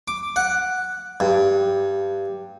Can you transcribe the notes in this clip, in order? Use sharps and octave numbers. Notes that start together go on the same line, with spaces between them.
D6
F#5
G2